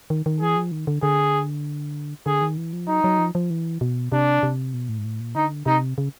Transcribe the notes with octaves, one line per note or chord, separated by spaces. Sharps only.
D#3
D#3
E3 G#4
F3
D#3
D3
D3 G#4
D3 G#4
D#3
E3
F3
F#3 D#4
F#3
F3
F3
E3
B2
C3 D4
C3
B2
A2
G#2
A2
A#2
D3 D#4
C3 D#4
C#3